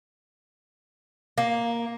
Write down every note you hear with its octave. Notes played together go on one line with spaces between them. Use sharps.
A#3